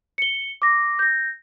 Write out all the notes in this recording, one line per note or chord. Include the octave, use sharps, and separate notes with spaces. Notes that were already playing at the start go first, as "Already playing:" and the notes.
C#7 G7
D6 A#6
G6 A#6